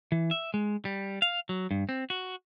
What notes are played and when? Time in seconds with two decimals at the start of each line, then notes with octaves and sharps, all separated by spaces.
0.12 E3
0.31 E5
0.54 G#3
0.85 G3
1.22 F5
1.49 F#3
1.71 G2
1.89 C4
2.10 F#4